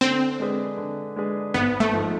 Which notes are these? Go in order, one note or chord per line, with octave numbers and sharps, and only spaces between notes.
D3 C4
G#3 D4 G#4 B4
D3
G#3 D4 G#4 B4
G#1 B3
A3
G#2 F3